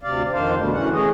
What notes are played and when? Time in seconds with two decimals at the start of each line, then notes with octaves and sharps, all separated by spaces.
0.03 D2 C3 D5 F5
0.32 F2 D#3 D4 C5 F5
0.58 B2 D3 G3 A3
0.73 F#2 E3 C#4 F#5
0.93 A3 C#4 G#4 D#5